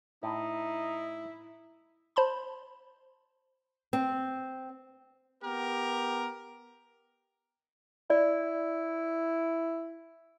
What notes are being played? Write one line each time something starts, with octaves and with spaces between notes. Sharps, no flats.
A2 D#4 E4
C5 A5 B5 C6
C4
B3 G4 A#4
E4 D5